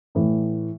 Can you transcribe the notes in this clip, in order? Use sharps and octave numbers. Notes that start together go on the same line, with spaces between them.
A2 E3